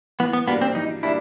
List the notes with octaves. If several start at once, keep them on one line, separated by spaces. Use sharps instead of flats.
E3 B3
B3
G3 A#3 B3 D4
C4
E3 D#4
G3 A#3 D4 E4